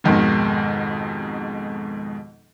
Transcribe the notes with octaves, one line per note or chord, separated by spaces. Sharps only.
G#1 F2 G#2 B2 D#3